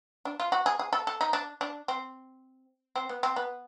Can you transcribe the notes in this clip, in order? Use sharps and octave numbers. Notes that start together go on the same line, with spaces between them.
D4
F4
F#4
G#4
G#4
A4
A4
D#4
D4
D4
C4
C4
B3
C4
B3